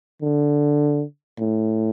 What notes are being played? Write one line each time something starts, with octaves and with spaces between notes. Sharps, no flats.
D3
A2